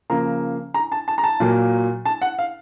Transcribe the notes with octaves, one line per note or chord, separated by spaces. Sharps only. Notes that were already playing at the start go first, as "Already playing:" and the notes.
C#3 F3 A#3 A#5
A#5
A5
A5
A#5
A5
A#2 F#3 A#3
A5
F#5
F5